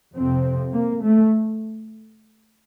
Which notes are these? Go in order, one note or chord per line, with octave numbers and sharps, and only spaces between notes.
F2 C3 C4
A#3
A3